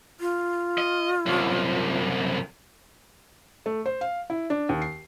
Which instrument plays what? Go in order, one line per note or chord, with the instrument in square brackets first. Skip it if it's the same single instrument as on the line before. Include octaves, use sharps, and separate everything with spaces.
[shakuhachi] F4
[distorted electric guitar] D#5
C2 F#2
[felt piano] A3
C5
F5
E4
D4
D#2
C7